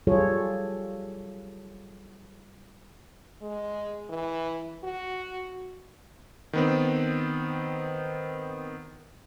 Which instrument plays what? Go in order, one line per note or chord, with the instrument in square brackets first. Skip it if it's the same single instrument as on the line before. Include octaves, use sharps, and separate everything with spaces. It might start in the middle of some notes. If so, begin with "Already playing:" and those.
[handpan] F#3 G3 F4 G#4 A4 C#5
[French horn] G#3
E3
F#4
[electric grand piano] D#3 B3 C4